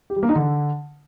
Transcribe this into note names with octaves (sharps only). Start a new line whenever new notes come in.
G4
G3
A#3
D#4
D3